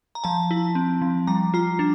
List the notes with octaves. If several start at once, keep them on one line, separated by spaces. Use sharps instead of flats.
A#5
F3 A5
E4
C4
F3
G3 A#5
F4 A#5
D4